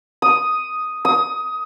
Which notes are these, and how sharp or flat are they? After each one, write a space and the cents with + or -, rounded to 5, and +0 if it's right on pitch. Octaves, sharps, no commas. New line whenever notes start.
D#6 +5
D#6 +20